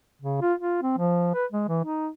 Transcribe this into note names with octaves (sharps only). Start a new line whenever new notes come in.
C#3
F4
F4
C4
F3
B4
G#3
E3
D#4